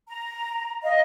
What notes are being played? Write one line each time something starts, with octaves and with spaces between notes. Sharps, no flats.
A#5
D#5 F5